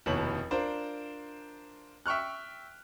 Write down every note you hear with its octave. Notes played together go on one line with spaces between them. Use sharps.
F1 D#2 B2 E4 C#5 F#7
D4 F4 A#4 C5
E5 G5 C#6 F6 F#6